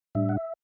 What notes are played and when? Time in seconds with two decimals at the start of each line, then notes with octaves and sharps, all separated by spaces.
0.15 A2 G3 D4 E5
0.29 F#5
0.37 E5